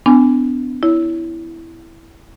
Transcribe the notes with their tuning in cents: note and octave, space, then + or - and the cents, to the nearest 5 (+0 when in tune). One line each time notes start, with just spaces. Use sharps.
B3 +40 D4 +0 G#5 +0
E4 +0 C#5 +30